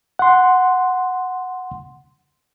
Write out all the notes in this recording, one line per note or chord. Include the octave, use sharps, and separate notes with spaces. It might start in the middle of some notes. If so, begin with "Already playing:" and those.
F#5 C6